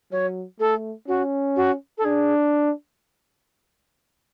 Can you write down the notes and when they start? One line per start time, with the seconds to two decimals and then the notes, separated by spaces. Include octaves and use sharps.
0.12 F#3 C#5
0.60 A3 A4
1.08 C#4 F#4
1.56 F#4
1.98 A4
2.04 D4 G#4